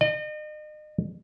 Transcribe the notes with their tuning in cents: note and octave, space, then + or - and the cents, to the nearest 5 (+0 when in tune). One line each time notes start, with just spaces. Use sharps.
D#5 -40